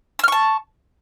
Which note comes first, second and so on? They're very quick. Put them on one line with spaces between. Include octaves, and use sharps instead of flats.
E6 F6 C#6 A5